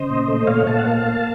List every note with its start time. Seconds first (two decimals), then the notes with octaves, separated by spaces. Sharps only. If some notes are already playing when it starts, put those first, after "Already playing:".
Already playing: C#3 C5 D#5
0.10 A#2
0.28 A3
0.47 A#2 C#5 F5
0.67 A#2 F5 A5
0.79 F#5
0.86 A#3 F5 A5
1.06 A#3